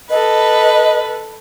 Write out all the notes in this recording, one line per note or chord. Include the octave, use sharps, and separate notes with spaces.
A4 B4 D#5